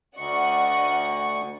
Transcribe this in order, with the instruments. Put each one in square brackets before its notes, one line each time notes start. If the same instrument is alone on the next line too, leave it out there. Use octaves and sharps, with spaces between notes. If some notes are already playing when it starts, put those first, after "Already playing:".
[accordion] D2 C#6 [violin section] D5 D#5 F#5